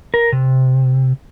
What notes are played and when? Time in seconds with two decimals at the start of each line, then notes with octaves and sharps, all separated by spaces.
0.14 A#4
0.32 C3